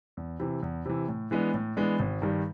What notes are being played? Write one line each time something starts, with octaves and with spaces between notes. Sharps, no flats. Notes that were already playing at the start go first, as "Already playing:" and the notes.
E2
C3 E3
E2
C3 E3
A2
E3 G#3 B3 D4
A2
E3 G#3 B3 D4
G#1
G2 D#3 G3